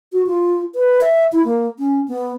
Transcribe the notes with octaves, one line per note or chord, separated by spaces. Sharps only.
F#4
F4
B4
E5
E4
A#3
C#4
B3